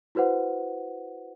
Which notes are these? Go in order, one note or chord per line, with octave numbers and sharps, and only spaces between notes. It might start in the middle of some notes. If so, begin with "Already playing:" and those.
E4 F#4 B4 C5 F#5